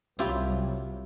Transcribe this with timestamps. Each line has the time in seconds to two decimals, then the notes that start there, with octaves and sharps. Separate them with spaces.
0.19 C2 F#3 E4 F4 G4